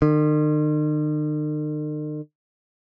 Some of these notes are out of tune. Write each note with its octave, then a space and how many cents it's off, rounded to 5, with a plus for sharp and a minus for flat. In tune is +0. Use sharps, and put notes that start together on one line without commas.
D#3 -45